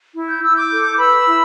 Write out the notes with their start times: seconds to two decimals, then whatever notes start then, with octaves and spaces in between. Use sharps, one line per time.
0.15 E4
0.29 G6
0.42 E4 E6
0.55 D6 G6
0.70 A4
0.98 B4 B5 E6
1.27 E4